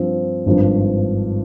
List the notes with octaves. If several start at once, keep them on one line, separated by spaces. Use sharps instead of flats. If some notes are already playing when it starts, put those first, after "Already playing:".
Already playing: G2 F3 C4
G#1 G2 F3